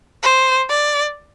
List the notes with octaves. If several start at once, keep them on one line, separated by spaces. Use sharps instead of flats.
C5
D5